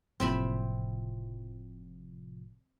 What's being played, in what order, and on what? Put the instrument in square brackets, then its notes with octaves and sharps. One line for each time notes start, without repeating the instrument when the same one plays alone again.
[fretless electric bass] F#1 [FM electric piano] A2 C3 F3 [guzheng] C4 E5 B5